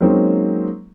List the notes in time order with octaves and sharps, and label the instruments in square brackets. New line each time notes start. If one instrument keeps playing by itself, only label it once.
[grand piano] F#3 G#3 A#3 C4 C#4 D#4